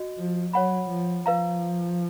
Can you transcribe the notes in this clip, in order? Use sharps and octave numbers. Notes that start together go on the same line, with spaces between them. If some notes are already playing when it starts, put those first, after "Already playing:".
Already playing: F#4 D#5
F3
F#3 C#5 F#5 B5
F3
F3 B4 F5 A#5